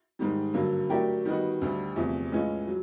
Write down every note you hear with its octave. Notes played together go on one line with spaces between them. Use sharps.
G#2 D#3 G3
G2 D3 F#3 A#3
F#3 A3 D4 G4 A#4
D#3 G3 B3 D#4 F#4
D2 D3 G3
E2 C3 F3 A3
A2 E3 G#3 C#4 F4
F#3